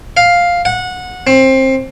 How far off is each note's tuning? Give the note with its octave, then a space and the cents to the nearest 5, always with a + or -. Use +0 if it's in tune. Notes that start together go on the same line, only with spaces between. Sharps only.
F5 +5
F#5 -20
C4 +20